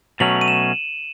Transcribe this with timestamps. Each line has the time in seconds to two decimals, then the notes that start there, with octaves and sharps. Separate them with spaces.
0.20 B2 F#3 A3 C#4 F#7
0.41 D#7
0.48 E7